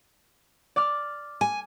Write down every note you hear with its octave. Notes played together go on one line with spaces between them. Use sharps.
D5 D6 F6
G#5